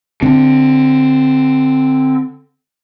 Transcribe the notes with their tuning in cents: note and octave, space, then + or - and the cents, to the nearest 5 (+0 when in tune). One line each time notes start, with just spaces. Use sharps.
D3 +0 C4 +0